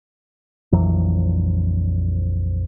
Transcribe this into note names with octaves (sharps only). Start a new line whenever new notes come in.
A#1 F2 E3 F#3